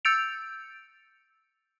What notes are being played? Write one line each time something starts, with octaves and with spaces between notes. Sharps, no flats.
E6 G6 A6 C#7 D7 F7